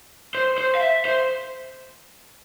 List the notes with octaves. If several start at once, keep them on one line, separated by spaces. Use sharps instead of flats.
C5
C5
F5
E5
C5